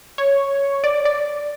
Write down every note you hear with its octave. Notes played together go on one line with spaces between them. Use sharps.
C#5
D5
D5